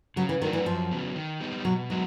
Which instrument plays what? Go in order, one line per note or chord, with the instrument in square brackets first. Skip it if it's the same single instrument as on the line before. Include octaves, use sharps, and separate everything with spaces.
[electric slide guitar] C#3 [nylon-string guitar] F#3
[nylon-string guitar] E3
[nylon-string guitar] D#3 [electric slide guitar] F#3 A3 D4 F#4
[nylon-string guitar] E3
[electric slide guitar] F#2 [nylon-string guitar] F3
[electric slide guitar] C#3 F#3 B3
D#3
G3 B3 D#4
[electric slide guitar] B2 [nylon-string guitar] F#3
[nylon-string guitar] F#3 [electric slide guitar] G#3 B3 D#4 F#4